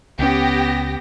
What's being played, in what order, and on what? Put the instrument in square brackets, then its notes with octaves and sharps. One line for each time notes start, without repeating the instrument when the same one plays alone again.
[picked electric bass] C#2 C#4 [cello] B3 [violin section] G4 A#6